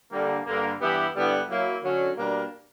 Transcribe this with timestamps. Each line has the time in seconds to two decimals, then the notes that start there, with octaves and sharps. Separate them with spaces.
0.12 D3 G3 A#3
0.45 G2 D3 A#3
0.79 G2 E3 B3 E4 G4
1.14 G2 D3 G3 B3 E4
1.48 F#3 A#3 E4
1.83 D3 F#3 C#4
2.17 B2 G3 A#3 D4 A#4